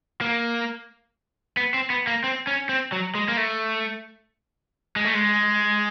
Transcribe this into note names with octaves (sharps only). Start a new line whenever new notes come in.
A#3
B3
C4
B3
A#3
C4
C#4
C4
F#3
G#3
A#3
A3
G#3
A3
G#3